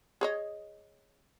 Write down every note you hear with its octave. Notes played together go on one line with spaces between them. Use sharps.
G#4 C#5 D#5